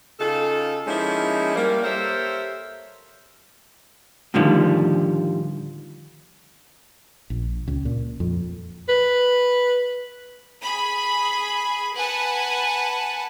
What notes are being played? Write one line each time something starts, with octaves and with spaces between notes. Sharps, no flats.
C#3 D#4 F4 A4
F3 G#3 A#3 C#4 D#4 E4
G3 A#3
G4 A4 A#4 C5 C#5 E5
A2 D3 D#3 F3 G3
A#1
C#2
A#2
F2
B4
G#4 B5
B4 F#5 G#5 A5